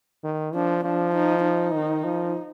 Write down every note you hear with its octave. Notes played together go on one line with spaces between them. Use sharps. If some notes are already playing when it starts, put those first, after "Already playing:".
D#3
F3 D4
F3 D4
D#4
D#4
D#3
F3